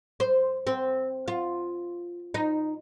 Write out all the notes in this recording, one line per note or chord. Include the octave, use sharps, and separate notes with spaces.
C5
C4
F4
D#4